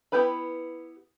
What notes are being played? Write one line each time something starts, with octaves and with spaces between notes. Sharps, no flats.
B3 E4 G4 B4 B5